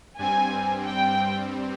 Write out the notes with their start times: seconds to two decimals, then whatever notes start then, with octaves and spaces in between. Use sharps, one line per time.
0.19 G2 G3 C4 G#5
0.86 G5